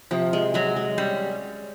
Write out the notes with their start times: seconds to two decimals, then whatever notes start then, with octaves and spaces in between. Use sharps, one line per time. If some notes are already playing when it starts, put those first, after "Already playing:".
0.11 C3 F3
0.33 G#3
0.54 F#3 G#3
0.76 G#3
0.98 G3 C#4